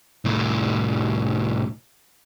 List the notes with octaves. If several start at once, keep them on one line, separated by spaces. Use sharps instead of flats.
C2 A2